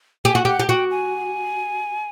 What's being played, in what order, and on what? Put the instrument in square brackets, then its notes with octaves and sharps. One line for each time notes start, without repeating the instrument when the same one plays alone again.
[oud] G4 [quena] G#5
[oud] F#4
[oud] G4 [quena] F#5
[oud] G4
[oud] F#4 [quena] G5
[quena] G#5